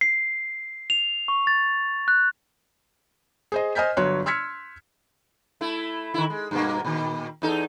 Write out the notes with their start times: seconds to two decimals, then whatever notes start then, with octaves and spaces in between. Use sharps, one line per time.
0.01 C7
0.90 F7
1.28 C#6
1.47 A6
2.08 F#6
3.52 G#4 C5 D#5
3.75 C5 D#5 G#5 F6 G6 B6
3.97 G1 F#3 C#5 C6 F#6
4.26 C6 E6 F6 G#6 B6 C#7
5.61 A3 E4
6.14 D#3 E4
6.30 G#3
6.51 G2 B2 A#3
6.85 A#2 D#3
7.42 E2 D#4 A4